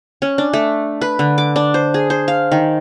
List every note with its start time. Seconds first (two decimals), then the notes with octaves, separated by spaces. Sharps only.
0.22 C#4
0.38 D4
0.53 A3
1.01 B4
1.19 D3
1.38 D6
1.56 D4
1.74 C5
1.94 G#4
2.10 C5
2.28 F5
2.52 D#3